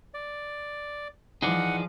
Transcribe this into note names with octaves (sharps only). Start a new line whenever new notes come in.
D5
E3 F3 D#4 G#4 D5 F#5